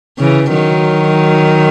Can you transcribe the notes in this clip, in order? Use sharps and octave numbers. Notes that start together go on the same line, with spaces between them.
C#3 E3
D#3 F#3